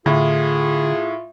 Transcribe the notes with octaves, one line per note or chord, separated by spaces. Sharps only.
A2 D3 F4 G#4